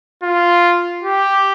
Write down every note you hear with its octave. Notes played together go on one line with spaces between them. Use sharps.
F4
G4